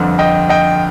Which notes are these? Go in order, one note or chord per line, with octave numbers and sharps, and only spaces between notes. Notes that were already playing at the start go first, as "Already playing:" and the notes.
Already playing: G1 F2 D3
D#5 G5
D#5 G5